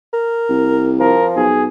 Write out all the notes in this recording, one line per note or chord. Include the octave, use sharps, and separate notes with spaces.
A#4
C2
F3 A#4
B1 G#4